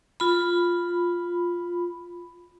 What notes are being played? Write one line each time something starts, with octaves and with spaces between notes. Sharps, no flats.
F4 B5